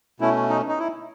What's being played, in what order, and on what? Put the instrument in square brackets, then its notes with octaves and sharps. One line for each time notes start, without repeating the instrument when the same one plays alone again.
[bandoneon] B2 A3 C#4 E4
D#4
D#4
E4